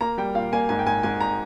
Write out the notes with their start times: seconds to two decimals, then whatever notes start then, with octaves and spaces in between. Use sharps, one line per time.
0.01 A#3 A#5
0.18 G3 G5
0.35 A#2 F5
0.52 A#3 G#5
0.69 G#2 G#5
0.79 G5
0.86 G#2 G#5
1.03 G#2 G#5
1.21 A#5